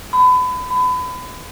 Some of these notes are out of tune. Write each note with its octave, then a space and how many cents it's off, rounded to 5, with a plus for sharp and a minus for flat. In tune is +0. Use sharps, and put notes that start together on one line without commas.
B5 +30
B5 +30